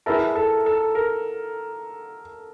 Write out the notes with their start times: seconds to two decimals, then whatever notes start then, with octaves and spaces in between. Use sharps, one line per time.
0.06 E4 G#4 A#4 B4 E5 A5
0.36 A4
0.66 A4
0.95 A#4